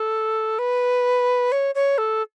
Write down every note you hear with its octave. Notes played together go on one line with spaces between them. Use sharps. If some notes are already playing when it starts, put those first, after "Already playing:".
Already playing: A4
B4
C#5
C#5
A4